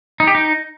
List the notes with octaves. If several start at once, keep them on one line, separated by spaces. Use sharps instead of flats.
D#4
G4
D#4